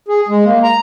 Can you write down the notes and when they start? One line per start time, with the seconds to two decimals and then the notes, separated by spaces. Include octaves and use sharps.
0.08 G#4
0.28 G#3
0.45 A#3
0.63 A#5